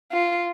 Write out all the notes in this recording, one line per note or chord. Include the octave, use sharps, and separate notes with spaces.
F4